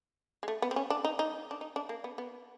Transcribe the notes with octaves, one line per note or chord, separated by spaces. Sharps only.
G#3
A3
B3
C4
C#4
D4
D#4
D#4
D4
D#4
D4
A#3
B3
B3